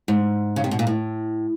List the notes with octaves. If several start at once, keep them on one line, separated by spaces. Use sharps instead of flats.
G#2
C#3
C3
B2
A#2
A2